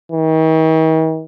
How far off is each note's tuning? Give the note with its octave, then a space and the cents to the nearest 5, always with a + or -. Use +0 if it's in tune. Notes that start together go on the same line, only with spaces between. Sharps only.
D#3 +45